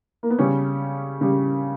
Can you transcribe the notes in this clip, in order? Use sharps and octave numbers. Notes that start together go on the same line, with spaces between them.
A#3
B3
C#3 G3 C#4
C#3 G3